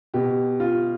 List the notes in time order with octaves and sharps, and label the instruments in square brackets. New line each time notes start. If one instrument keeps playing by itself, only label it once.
[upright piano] B2 G4
F4